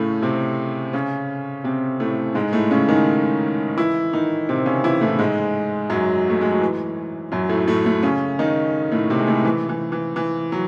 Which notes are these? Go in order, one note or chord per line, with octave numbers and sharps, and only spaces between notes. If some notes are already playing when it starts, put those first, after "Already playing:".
Already playing: A2 C#3 A3 C#4
C3 C4
C#3 C#4
C3 C4
A2 A3
G#2 G#3
A2 A3
C#3 C#4
D#3 D#4
E3 E4
D#3 D#4
C3 C4
C#3 C#4
E3 E4
A2 A3
G#2 G#3
F#2 F#3
A3
G#3
F#3
E3
F#2 F#3
A2 A3
A2 A3
A2 A3
C#3 C#4
D#3 D#4
A2 A3
C3 C4
G#3
A2 A3
E3
E3
E3
E3
F#3